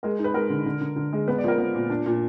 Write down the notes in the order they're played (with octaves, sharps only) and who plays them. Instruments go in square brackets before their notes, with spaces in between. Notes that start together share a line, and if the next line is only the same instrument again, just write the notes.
[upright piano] G#3 A#4
D#4
B4
G#3 A#4
D3
D3
D3
D3
G#3
B3 B4
D5
F3 A#4
B3
A#2
D4
A#2